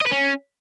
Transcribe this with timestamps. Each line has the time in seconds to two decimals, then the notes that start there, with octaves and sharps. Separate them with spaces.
0.01 D#5
0.06 B4
0.11 C#4